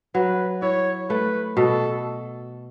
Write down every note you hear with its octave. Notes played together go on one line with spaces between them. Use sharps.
F#3 B4
E4 C#5
A3 B4
B2 A4